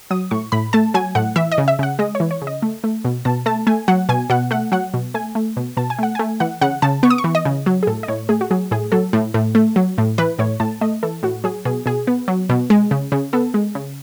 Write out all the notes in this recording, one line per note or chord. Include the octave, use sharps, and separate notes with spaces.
F#3 D#6
A2 C#6
A2 B5
A3 A5
F#3 G#5
A2 F#5
E3 E5
D#5
C#3
E5
C#3 F#5
G#3 D#5
C#5
E3
C#5
C#3
D#5
A3
A3
B2
B2 A5
A3 A5
A3 G#5
F#3 F#5
B2 G#5
B2 F#5
A3 F#5
F#3 F#5
B2
A3 G#5
A3
B2
B2 A5
G#5
A3 F#5
A3 G#5
E3 F#5
C#3 F#5
C#3 A5
B3 C#6
D#6
C#6
E3
D#5
C#3
F#3
G#4
A2 A4
D#5
A2 C#5
A3 G#4
F#4
F#3 G#4
A2 G#4
F#3 A4
A2
A2
A3
F#3
A2
E3 B4
A2 C#5
A2 A5
A3 D#5
E3 A4
A2 F#4
F#3 G#4
B2 G#4
B2 G#4
B3
F#3
B2
G#3
C#3
C#3
B3 A4
G#3
C#3